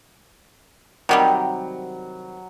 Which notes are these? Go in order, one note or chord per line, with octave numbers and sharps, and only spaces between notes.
C3 D#3 F#3 G3